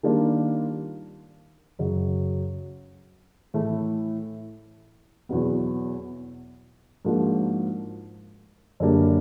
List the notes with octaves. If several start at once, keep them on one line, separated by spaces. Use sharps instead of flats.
D#3 G3 A#3 D4 F4
F#2 C#3 F#3
A2 E3 A3
E2 B2 F#3 B3
G#2 F3 A#3 D4 F#4
F#2 D3 G3 A#3 D4